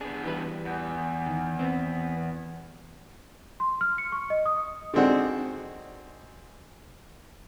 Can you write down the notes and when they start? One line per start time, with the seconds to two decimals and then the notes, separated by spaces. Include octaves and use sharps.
0.01 B3 D4 G#4
0.24 E3 G3 B4
0.65 E2
1.26 D#3
1.59 B3 C4
3.60 C6
3.81 F6
3.98 C#7
4.12 C#6
4.30 D#5
4.46 D#6
4.94 D3 D#3 G#3 C4 D4 F#4